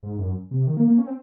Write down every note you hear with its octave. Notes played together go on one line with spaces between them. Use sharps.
G#2
F#2
C3
D#3
A#3
A#3
C#4
C4